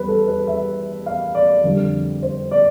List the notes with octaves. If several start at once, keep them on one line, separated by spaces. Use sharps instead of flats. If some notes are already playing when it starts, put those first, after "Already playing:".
Already playing: E2 G3 B4
A4
B4
E5
F5
D5
F2 D3 G3
C5
D5